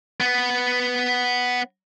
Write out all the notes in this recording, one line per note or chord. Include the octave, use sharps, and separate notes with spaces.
B3